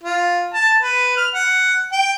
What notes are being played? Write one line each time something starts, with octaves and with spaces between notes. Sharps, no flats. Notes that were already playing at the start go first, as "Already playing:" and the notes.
F4
A5
B4
F6
F#5
G5